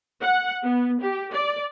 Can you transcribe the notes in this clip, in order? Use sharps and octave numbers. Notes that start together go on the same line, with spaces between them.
F#5
B3
G4
D5